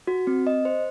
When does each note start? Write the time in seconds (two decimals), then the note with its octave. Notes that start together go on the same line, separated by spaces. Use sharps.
0.07 F#4
0.27 C4
0.47 D#5
0.65 C5